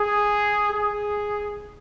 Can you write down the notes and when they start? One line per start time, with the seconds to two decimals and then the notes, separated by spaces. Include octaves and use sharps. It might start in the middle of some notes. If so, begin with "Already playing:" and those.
Already playing: G#4
0.71 G#4